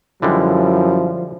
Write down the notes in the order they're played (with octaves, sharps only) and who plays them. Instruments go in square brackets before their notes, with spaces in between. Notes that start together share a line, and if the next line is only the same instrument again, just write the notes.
[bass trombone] F#2 [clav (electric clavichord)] D3 G3 G#3 [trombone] F3 [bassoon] E4